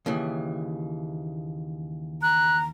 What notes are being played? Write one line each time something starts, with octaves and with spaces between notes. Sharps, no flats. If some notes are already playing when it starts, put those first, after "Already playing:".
D#2 C#3 E3
A#5 F#6